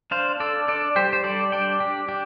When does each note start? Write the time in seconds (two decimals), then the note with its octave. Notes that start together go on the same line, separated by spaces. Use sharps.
0.11 D4 C5 F5
0.40 D4 A4 D5
0.68 D4 A4 D5
0.96 G3 G4 C5
1.13 C5
1.24 G3 A4 D5
1.52 D4 D5 G5
1.80 D4 G4
2.08 D4 G4